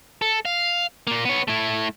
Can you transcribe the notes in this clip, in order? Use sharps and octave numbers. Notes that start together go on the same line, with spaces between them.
A4
F5
A#2 A#3
B3 C#5
A3 E4